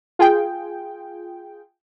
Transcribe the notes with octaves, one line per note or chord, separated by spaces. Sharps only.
F4 G#4 G5